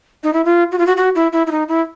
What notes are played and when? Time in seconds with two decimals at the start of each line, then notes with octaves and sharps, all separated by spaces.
0.24 D#4
0.33 E4
0.45 F4
0.72 F#4
0.78 F4
0.87 F#4
0.97 F#4
1.15 E4
1.33 E4
1.47 E4
1.51 D#4
1.68 E4